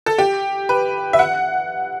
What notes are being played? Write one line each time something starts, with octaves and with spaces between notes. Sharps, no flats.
A4
G4
B4
E5
F#5